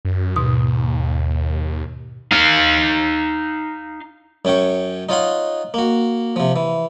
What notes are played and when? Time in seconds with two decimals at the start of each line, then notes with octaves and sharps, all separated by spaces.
0.05 F#2
0.36 D#2 G#2 B2 D#6
2.31 D#4 F5
4.45 F#2 C#4 G5 C#6
5.09 D#4 F4 C#5 F#5 C6
5.74 A#3 F#4
6.36 C3 F3
6.56 E3